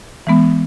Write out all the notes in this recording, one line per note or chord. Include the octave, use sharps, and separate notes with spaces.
E3 G#3 B3